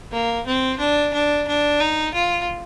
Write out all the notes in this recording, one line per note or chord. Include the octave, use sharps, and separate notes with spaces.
A#3
C4
D4
D4
D4
D#4
F4